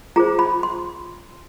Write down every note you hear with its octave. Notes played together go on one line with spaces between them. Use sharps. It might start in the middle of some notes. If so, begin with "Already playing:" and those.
F4 G#4 C5 A#5
B5
C6